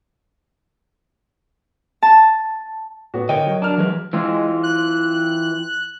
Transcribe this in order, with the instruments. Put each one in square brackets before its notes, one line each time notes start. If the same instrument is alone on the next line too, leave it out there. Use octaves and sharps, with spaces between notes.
[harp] A5
[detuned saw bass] A2 [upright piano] B3 F#4
[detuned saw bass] D3 [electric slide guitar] A#4 C#5 D#5 [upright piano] G5
[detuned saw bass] F#3
[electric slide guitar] D4 [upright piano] A#4 F6
[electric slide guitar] E3 G#3 B4
[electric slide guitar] E3 C4 F4 [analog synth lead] G#3
[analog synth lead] F#6